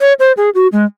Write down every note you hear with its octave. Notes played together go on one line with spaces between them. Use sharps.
C#5
C5
G#4
F#4
G#3